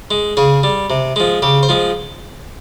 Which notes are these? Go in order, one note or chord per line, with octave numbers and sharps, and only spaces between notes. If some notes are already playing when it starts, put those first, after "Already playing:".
G#3
C#3 G#4
G3
C3
F3 G#3
C#3 G4
C5
F3 G#3